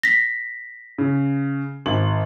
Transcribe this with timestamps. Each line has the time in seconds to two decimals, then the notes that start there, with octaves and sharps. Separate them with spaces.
0.03 A#6 B6
0.98 C#3
1.86 G#1 F#7